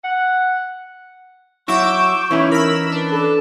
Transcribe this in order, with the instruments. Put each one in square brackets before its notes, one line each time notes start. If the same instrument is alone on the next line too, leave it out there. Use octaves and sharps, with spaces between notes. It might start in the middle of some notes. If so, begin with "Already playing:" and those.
[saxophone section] F#5
[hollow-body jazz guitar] F#3 E4 F#4 [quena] C#6 [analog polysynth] D6 E6 G6
[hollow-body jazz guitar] E3 C#4 D#4 [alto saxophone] E4
[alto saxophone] A#4 [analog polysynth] B5 E6
[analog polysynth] D4 [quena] B4
[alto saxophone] A4